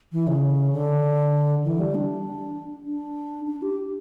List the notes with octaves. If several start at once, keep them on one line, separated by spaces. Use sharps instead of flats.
E3
C#3
D3
E3
G3
D4
D4
D4
G4